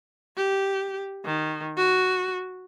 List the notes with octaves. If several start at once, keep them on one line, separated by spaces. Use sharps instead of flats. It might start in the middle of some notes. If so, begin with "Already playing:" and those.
G4
D#3
F#4